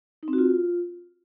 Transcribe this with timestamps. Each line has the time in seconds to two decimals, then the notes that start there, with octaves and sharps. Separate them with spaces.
0.23 D#4
0.28 C4
0.33 F#4
0.38 F4